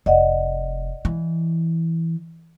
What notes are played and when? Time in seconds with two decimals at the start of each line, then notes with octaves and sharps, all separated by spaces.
0.06 F1 D5 D#5 F#5
1.05 E3